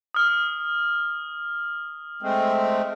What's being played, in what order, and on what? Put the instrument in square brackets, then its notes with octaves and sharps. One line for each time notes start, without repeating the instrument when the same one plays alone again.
[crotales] D#6 F6
[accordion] G#3 A3 C4